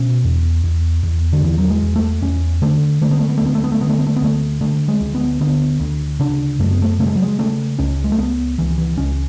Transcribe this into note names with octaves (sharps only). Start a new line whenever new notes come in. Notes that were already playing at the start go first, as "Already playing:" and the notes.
Already playing: B2 C#4
E2
E2
E2
D3
E2 E3
F#3
G#3
E2
A3
E2 C#4
D3 A3
D3 A3
B3
A3
B3
A3
D2 B3
A3
B3
A3
D3 B3
A3
B3
A3
B3
D2 A3
D3 A3
G#3
D2
B3
D3 B3
D2
C#3 D4
F#2 A3
B3
A3
C#3 A3
G#3
F#3
G#3
C#3 A3
C#2 C#4
G#3
A3
C#2 B3
C#2 E3
E3
C#2 C#4